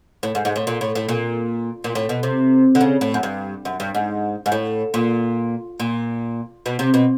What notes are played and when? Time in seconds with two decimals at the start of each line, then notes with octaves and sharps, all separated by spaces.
0.23 A2
0.35 G#2
0.45 G#2
0.56 A2
0.67 A#2
0.81 A2
0.95 A2
1.09 A#2
1.84 A#2
1.95 A2
2.09 B2
2.23 C3
2.75 D3
2.81 C#3
3.01 A2
3.14 F#2
3.23 G2
3.65 F#2
3.80 G2
3.95 G#2
4.46 G#2
4.52 A2
4.94 A#2
5.80 A#2
6.66 B2
6.79 C3
6.94 B2